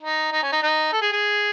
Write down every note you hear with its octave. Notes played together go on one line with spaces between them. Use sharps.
D#4
D#4
C#4
D#4
D#4
A4
G#4
G#4